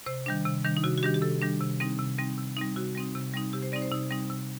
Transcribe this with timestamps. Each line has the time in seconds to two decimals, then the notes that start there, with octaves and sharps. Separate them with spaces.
0.06 C3 C5
0.26 D#3 G3 D4
0.46 C3
0.64 D#3 G3 D4
0.77 D#4
0.84 C3 F#4
0.98 F#4
1.03 D#3 G3 D4 G4
1.14 G4
1.22 C3 A4
1.42 D#3 G3 D4
1.61 C3
1.80 G3 C4 D#4
1.99 C3
2.18 G3 C4 D#4
2.38 C3
2.57 G3 C4 D#4
2.76 C3 F#4
2.95 G3 C4 D#4
3.15 C3
3.34 G3 C4 D#4
3.53 C3 G4
3.63 C5
3.72 G3 C4 D#4 D5
3.82 C5
3.91 C3 D#4
4.11 G3 C4 D#4
4.30 C3